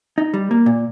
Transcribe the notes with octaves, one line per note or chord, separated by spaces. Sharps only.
D#4
G3
A#3
A#2